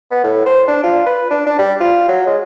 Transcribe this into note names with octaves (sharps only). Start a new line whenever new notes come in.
B3
A2
C5
D4
F4
B4
D4
D4
G3
F4
F#3
G#3